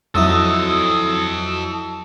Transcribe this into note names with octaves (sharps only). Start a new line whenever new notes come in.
F2 F#3 E4 A4 D#5 D#6 E6